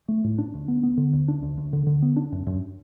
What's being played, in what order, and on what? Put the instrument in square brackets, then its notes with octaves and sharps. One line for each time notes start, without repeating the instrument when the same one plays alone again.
[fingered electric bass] A3
A2
D4
D2
B3
B3
D3
D2
D4
D2
D2
D3
D3
B3
D4
F#2
F#2